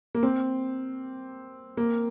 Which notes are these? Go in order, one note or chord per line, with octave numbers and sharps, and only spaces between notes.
A#3
C4
A#3